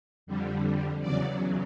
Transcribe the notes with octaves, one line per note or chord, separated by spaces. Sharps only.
F2 D3 G3
E2 C#3 F#3 D5